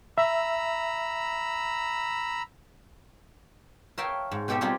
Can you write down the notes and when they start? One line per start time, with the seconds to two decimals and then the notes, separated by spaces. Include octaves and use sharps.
0.18 E5 A#5 B5 E6
3.98 A#4 C#5 E5 F5 G5 A5
4.31 G#2
4.48 B2 G#3 G4 A4 D#5 E5
4.61 G3 C4 D#4 F4 G4 G#4